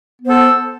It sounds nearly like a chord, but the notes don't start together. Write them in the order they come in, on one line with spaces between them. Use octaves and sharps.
B3 C5 A4